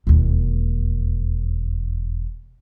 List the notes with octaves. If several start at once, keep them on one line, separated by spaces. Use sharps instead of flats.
E1 D#2